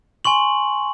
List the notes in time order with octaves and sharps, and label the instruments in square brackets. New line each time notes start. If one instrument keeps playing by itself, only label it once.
[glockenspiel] G#5 C6 C#6 F#7